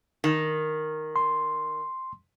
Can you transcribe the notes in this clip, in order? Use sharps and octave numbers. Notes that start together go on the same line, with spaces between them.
D#3
C6